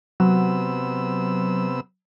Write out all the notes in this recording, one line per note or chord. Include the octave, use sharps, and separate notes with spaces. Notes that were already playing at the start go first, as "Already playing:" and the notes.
C3 F#3 B3 E6